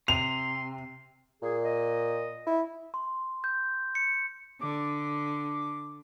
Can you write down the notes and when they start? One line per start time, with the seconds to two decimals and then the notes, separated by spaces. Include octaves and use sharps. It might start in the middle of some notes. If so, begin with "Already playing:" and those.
0.08 C3 C6 F7
1.42 A#2 G#4
1.63 D#5
2.47 E4
2.94 C6
3.44 G6
3.95 C#7
4.61 D3 D6